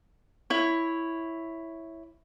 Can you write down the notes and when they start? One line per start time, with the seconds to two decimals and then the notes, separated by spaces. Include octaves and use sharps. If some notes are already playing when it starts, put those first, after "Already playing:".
0.50 E4 C#5